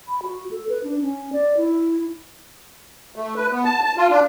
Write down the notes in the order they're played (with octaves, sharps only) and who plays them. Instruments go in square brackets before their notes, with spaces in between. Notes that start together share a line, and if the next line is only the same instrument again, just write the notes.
[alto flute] B5
F#4
A4
B4
D4
C#4
D5
E4
[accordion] A3
B4
B3
A5
A5
F4
D4